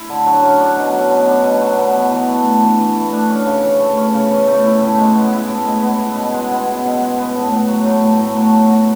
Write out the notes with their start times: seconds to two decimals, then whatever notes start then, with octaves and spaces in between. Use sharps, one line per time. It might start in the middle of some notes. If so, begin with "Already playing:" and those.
Already playing: E4
0.09 D3
0.26 F#3
0.42 C#4
0.60 D4
0.76 B2
0.93 F#3
1.10 B3
1.27 D4
1.44 B2
1.61 F#3
1.78 B3
1.95 E3
2.12 E3
2.29 A3
2.45 D4
2.62 E3
2.79 E3
2.96 A3
3.13 D4
3.30 C#4
3.46 C#3
3.63 E3
3.80 A3
3.97 C#4
4.14 C#3
4.31 E3
4.47 A3
4.65 E4
4.81 A2
4.98 G#3
5.15 B3
5.33 E4
5.49 A2
5.66 G#3
5.83 B3
5.99 E4
6.17 B2
6.34 G#3
6.51 B3
6.67 E4
6.85 B2
7.01 G#3
7.18 B3
7.35 A2
7.51 A2
7.68 F#3
7.85 A3
8.03 A2
8.19 A2
8.37 F#3
8.53 A3
8.70 F#4